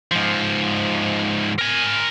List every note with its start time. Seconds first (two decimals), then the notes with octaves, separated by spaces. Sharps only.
0.12 G#2 F3
1.58 A#4 G#5